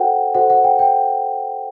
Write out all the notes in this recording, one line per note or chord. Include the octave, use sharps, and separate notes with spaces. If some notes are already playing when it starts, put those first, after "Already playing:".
Already playing: F#4 A4 C5 F#5 G5
F#4 A4 C5 F#5
F#5
G5
G5